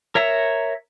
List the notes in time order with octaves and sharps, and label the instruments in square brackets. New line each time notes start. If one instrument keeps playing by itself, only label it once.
[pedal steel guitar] A#4 C#5 E5 A#5